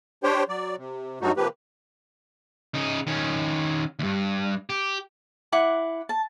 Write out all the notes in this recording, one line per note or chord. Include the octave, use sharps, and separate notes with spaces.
D4 G4 C5 C#5 G5
F#3 D5
C3
G2 F#3 G3 A3 D#4 F#4
C3 D#3 F3 A#3 G4 B4
C#3 D#4
D#3 C#4
D2 G2
G4
E4 F#5 D6
A5